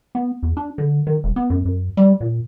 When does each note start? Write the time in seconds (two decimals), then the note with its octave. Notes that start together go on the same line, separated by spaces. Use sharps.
0.15 B3
0.43 E2
0.57 D4
0.78 D3
1.07 D#3
1.24 E1
1.36 B3
1.50 F#2
1.65 F#2
1.97 G3
2.21 A#2